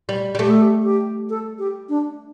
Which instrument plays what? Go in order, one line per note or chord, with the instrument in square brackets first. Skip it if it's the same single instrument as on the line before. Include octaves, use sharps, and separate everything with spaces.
[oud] G3
G3
[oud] A3 [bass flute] G4
[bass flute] A4
G4
G4
A4
G4
D4